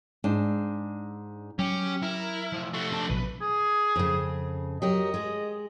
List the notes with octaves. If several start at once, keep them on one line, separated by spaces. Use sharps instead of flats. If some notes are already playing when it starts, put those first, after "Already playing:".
G#2 D4
F#3 C#4 G4
E4 A#4
F3 A3
F3 A3 F#4
D4 A5
A#1 B2 F#3 B4
G#4
F2 C#3
F#3 G4 A#4 D#5
G#3 G#4